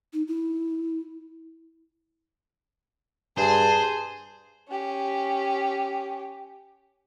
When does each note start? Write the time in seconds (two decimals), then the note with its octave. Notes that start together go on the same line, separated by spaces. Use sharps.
0.13 D#4
0.28 E4
3.38 G2 G#4 C5 A5
4.69 C#4 G4